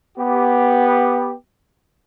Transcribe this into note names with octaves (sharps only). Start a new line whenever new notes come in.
B3 G4